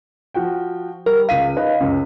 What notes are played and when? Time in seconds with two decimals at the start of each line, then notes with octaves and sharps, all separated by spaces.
0.34 F3 F#4 G5
1.06 G3 A#4
1.29 C#2 F5 B6 D#7
1.56 D#4 B4 D#5
1.80 C#2 F#2